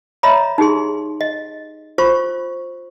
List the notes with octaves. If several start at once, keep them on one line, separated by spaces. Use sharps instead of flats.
C#5 D#5 E5 A#5 B5
D#4 G4 G#4 C6
D#5
F4 C5 C#6